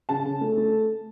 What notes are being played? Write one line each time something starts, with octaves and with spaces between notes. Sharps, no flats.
C#3 A5
C#3
A3
A3